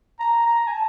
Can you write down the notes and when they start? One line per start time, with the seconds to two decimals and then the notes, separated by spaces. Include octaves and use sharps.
0.19 A#5
0.46 A#5
0.67 G#5
0.72 A5